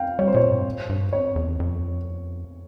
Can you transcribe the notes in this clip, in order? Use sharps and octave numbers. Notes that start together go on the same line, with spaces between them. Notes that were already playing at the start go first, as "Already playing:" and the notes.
Already playing: F5 G5
G3 C#5
C5
A#2 C#5
G2
G2
C#5
E2
F2